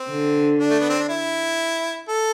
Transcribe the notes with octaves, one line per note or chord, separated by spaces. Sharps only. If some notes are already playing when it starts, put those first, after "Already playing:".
Already playing: C4
D3
D4
A3
B3
C4
D4
E4
A4